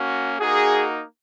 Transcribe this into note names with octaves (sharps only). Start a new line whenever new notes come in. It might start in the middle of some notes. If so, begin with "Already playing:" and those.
Already playing: A#3 C#4 F#4
A#3 D#4 F#4 G#4